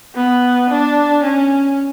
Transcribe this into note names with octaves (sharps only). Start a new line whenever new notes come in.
B3
D4
C#4